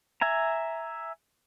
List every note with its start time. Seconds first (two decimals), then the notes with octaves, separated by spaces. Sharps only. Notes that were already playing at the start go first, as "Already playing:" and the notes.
0.21 E5 G#5 A#5